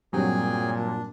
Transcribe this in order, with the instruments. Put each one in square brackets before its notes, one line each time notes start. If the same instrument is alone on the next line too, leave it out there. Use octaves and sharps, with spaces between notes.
[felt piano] G2 G3 C4 [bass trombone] A#2 [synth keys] F#3 [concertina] G#4 G5 G#5
[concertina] D4